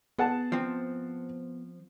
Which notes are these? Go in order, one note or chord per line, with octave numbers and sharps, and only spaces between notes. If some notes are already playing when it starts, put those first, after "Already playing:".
B3 G#4 F#5 A5
F3 C4